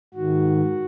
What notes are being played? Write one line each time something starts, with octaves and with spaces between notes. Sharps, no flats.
G#2 D#3 F#4